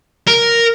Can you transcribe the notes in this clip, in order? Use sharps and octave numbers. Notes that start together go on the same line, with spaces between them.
A#4